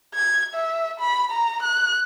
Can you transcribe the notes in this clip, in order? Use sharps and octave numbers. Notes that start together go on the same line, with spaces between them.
G#6
E5
B5
A#5
F#6